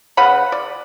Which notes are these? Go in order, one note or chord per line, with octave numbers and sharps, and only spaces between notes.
C#3 B4 F#5 B5
D5